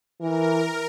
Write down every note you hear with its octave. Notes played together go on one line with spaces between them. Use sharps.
E3 A#4